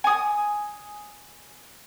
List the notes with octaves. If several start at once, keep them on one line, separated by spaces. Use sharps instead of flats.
G#5 D#6